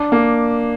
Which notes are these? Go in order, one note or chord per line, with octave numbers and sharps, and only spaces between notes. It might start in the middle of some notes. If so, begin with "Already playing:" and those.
Already playing: D4
A#3